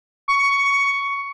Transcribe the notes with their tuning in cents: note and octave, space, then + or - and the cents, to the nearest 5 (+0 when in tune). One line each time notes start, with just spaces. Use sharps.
C#6 +15